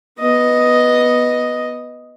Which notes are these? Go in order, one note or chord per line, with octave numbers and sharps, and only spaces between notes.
B3 D#5